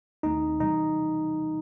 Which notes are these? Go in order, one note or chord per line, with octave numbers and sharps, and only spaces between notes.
D#2 D#3 A3 C4 D#4
C3 E3 G3 D#4